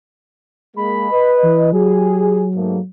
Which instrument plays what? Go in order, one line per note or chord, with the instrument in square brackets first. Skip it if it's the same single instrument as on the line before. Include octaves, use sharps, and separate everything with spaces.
[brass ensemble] G#3 A#3 [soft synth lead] B5
[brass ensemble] B4 D#5
[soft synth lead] E3
[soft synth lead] F#3 [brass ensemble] G4 G#4
[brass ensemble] G#2 A3 A#3